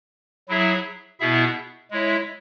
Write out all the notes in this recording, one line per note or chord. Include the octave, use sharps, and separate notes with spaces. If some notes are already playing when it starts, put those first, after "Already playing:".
F#3 E4 G#4 C#5 E5
B2 B3 E4 G#4 E5
G#3 E4 C#5 E5